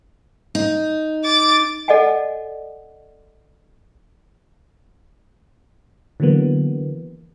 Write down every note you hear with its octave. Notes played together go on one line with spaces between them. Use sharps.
D#4
D6 A6
A4 D5 D#5 F#5 G#5
D3 E3 F#3 A#3 B3